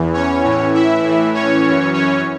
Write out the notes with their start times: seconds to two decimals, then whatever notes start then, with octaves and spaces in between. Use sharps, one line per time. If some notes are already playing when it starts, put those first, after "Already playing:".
Already playing: E2 E3
0.13 C#4 C#5
0.44 A2 E3
0.74 E4 E5
1.04 A2 E3
1.34 C#4 C#5
1.64 F#2 E3
1.93 C#4 C#5